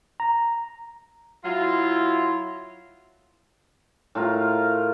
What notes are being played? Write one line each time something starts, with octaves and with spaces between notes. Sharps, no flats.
A#5
F#3 E4 F4
A2 F4 A#4 F5